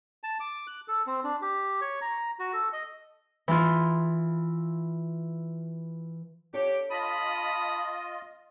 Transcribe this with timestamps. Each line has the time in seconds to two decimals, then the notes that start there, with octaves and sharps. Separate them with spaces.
0.23 A5
0.40 D6
0.67 F#6
0.88 A4
1.07 C4
1.24 D4
1.42 G4
1.81 C#5
2.02 A#5
2.40 F#4
2.53 A4
2.73 D#5
3.48 E3 E4 F4
6.53 D4 G4 A4 C#5
6.91 F4 D#5 A5 B5 D#6